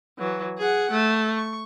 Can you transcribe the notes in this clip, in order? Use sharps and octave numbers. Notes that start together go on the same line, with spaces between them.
E3 F#3
G#4 F#5
A3
C#6